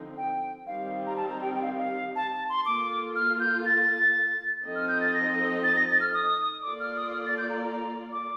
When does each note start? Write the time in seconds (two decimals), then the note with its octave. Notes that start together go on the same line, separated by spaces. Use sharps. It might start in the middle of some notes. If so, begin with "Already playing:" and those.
Already playing: D3 F3 C4 D#4
0.17 G5
0.66 D#3 G3 C4 D#4 F5
1.06 A#5
1.17 A5
1.29 A#5
1.42 G5
1.54 G5
1.62 F5
1.78 F5
2.16 A5
2.33 A5
2.49 C6
2.65 A#3 F4 A4 D6
3.16 F6
3.40 G6
3.66 A6
4.64 F3 C4 D#4 A4 D#5
4.76 F6
4.88 G6
5.01 A6
5.14 A#6
5.64 A6
5.76 A#6
5.89 A6
6.01 F6
6.14 D#6
6.63 A#3 F4 A4 D5 D6
6.80 F6
6.97 D#6
7.13 F6
7.26 A6
7.38 G6
7.50 A#5
7.63 A#5
8.12 D6